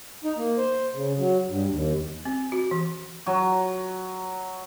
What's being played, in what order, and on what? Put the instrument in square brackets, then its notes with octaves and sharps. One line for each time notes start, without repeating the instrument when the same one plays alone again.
[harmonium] D#4
A#3
C5
C#3
F#3
G2
D#2
[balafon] C4
F#4
E3
[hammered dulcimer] F#3